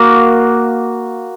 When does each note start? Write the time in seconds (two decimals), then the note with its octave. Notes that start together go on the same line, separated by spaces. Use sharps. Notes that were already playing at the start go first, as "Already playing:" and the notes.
Already playing: A#3 F#4